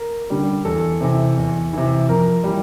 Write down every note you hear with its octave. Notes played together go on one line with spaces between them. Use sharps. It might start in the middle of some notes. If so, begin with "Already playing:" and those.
Already playing: A#4
D3 G3
E2 A4
C3 E3
E2
C3 E3
F2 A#4
E3 G3